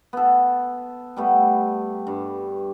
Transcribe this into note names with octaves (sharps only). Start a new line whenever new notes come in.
B3 A4
G3 A3 B3
G2